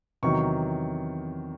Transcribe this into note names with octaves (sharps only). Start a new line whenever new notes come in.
E2 C3 D#3 F#3 C#6